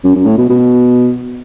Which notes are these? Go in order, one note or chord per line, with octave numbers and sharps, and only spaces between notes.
F#2
F#2
A2
B2
B2